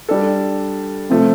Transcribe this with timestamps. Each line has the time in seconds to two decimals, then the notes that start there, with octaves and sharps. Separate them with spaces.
0.09 G3 D4 A4
1.09 C3 F3 A3